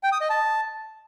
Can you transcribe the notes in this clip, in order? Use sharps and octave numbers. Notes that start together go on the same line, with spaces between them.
G5
D#6
D#5
A5